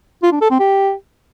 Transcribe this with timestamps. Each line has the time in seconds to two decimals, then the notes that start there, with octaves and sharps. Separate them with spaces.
0.23 F4
0.32 D4
0.41 A4
0.50 C4
0.60 G4